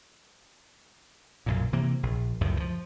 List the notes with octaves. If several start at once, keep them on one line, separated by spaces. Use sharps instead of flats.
B1 F#2 A#2
C3 E3 A#3
A#1
C#2 F#2 A2 C3
E3 F3